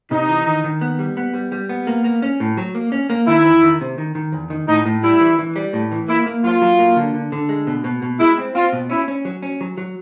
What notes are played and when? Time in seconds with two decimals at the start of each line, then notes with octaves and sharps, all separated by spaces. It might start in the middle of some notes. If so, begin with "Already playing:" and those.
0.11 C3 D#4
0.28 E3
0.47 D#3
0.64 D#3
0.81 B3
0.99 G3
1.17 B3
1.34 G3
1.52 G3
1.69 B3
1.87 A#3
2.04 A#3
2.22 C#4
2.40 A2
2.57 F#3
2.75 A#3
2.92 C#4
3.10 A#3
3.27 D#3 E4
3.45 E2
3.62 D#3
3.81 C3
3.98 D#3
4.15 D#3
4.32 E2
4.50 D#3
4.68 A2 D#4
4.86 A2
5.03 G3 E4
5.21 E3
5.39 E3
5.56 G3
5.73 A2
5.92 E3
6.08 A#3 E4
6.26 A#3
6.44 F#3 F4
6.62 F#3
6.79 A#3
6.96 D3
7.14 D3
7.32 D3
7.49 G#3
7.67 B2
7.84 B2
8.02 B2
8.20 G#3 E4
8.38 C4
8.55 C4 F4
8.73 B2
8.90 C#4 E4
9.08 C#4
9.25 F#3
9.43 C#4
9.61 F#3
9.78 F#3